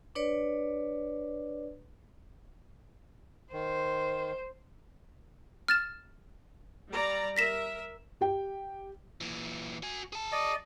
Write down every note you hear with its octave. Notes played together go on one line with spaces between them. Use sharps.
D4 B4 C#5 D5
D#3 C5
F6 A6 E7
G3 D5 A#5
A#4 E5 A#6 B6 E7
G4 G5
A#2 E3
F#4 G#5
G#4 A5
D5 D#5